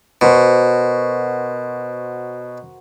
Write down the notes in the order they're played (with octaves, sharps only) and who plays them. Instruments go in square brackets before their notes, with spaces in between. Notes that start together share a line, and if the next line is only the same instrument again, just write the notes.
[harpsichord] B2 [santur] F#4 A#4 C5